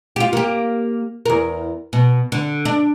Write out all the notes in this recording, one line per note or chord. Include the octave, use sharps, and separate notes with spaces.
F4 G4
A#3 G4
E2 A#4
B2
D3
D4